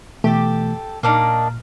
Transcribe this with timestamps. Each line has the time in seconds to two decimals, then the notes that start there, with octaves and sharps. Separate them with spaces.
0.24 B2 E3 A3 G4 A4
1.03 A#2 A#3 D4 D#4 F6